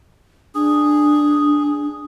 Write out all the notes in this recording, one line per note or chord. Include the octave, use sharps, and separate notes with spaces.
D4 G#4